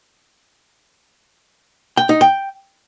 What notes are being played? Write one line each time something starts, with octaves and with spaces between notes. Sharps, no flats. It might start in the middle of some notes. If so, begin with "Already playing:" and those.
G5
D#4
G5